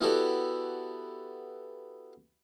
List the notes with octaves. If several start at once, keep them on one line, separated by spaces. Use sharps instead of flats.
B3 E4 F#4 G4 A4 D5